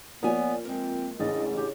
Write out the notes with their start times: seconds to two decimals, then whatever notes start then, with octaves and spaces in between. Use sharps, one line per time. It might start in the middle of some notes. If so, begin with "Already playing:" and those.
0.23 F3 A#3 B3 C#5 D5 G#5
0.65 G#3 C4 A#4
1.20 A1 C#3 D4 D#5 A6
1.57 G4 C#5